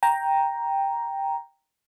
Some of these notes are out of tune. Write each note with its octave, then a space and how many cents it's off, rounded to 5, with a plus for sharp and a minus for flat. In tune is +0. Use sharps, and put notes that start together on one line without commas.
G5 +5 A#5 +5